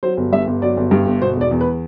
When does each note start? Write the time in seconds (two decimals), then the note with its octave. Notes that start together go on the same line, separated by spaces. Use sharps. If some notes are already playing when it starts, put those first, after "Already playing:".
0.03 F#3 C5
0.17 G1
0.33 G2 E5
0.47 G1
0.62 F#3 D5
0.77 G1
0.91 G2
1.07 G1
1.21 B2 C5
1.37 E1 D5
1.51 E2
1.61 B4